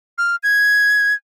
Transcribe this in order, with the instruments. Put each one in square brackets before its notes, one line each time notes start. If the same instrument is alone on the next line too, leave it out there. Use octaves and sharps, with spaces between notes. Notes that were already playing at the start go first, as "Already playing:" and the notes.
[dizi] F6
G#6